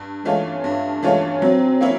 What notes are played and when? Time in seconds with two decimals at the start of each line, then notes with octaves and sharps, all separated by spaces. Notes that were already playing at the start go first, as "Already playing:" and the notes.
Already playing: G2
0.25 E3 G#3 A3 C#4 F4
0.64 G2
1.03 E3 G#3 A3 C#4 F4
1.42 F#3 C4
1.81 A#3 C#4 E4